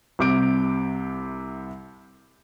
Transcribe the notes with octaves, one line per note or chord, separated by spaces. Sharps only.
C2 C3 D6 G6 D7